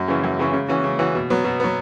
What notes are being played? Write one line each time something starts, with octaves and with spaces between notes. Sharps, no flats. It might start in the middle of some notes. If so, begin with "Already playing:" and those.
Already playing: F#2
C#3 E3 C#4
F#2
C#3 E3 C#4
C#3
E3 C#4 F#4
C#3
E3 C#4 F#4
B2
F#3 B3
B2
F#3 B3